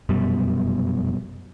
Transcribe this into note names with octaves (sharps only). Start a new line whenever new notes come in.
F1 F#2 B2 G3